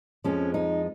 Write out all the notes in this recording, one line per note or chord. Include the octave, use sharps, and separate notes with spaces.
F2 F3 G#3 C#4
D#4